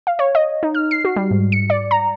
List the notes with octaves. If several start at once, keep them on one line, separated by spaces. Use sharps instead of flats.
F5
C#5
D#5
D#4
F6
C7
F#4
G3
G#2
C#7
D5
A#5